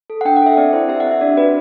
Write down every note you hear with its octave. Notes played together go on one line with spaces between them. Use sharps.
A4
F#5
D4 G5
F#5
A4 E5
C4 D5
E4 C5
G4 E5
F#5
C4
E5
D4 D5
F#4 B4